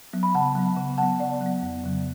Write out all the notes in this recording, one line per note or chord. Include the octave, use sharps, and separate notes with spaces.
F#3 B3
B5
C#3 F#5 A5
F#3 B3
C#3
F#3 B3 F#5 A5
C#3 D5 F#5
F#3
B3
F2
C#3 F#3